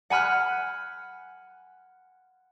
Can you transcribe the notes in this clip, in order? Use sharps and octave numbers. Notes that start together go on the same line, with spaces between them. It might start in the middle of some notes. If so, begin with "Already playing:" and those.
F#5 G#5 B5 F6 F#6